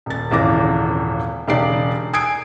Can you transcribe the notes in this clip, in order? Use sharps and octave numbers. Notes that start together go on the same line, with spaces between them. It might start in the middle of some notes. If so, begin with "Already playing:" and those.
D#1 A6
D#1 G#1 C#3 E3 D6 A#6
E1 C#3 D#4 G4 D5 C7
G#5 D#6 E6 G#6 C7 D7